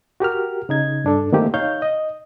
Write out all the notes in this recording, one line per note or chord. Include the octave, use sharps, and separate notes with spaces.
F#4 G4 A#4 F6
C#3 D#4 G#6
G2 D4 A4
D#3 A3 A#3 C4 G4
D#4 C#5 F5 G6
D#5